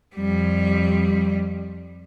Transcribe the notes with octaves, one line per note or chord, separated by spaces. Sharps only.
F2 G3